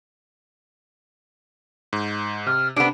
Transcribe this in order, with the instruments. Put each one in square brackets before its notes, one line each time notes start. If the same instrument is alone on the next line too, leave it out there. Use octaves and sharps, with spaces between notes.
[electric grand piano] G#2
[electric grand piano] C3 [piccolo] F6
[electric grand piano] C3 [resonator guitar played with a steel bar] B3 D4 [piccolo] D7